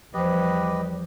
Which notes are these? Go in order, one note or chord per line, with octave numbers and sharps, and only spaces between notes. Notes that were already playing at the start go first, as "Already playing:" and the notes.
E2 F3 G3 G4 B4 C5 D#5